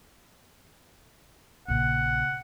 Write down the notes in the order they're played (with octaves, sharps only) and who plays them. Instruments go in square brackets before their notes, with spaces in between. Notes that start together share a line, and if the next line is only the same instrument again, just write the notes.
[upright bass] A#1 C#3 [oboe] F#5